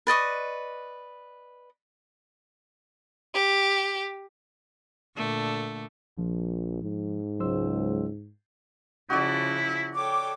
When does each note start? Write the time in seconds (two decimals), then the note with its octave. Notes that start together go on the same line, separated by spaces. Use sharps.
0.07 B4 D5 D#5 C#6
3.33 G4
5.16 A#2 D3 A3
6.18 A#1 F3
6.83 G#2
7.40 C#2 F#3 C5 E6
9.10 C#3 F3 E4 F#4 D5
9.95 A4 C#5 G5 D6